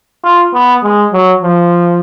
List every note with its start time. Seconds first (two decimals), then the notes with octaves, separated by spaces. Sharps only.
0.24 F4
0.54 B3
0.83 G#3
1.13 F#3
1.42 F3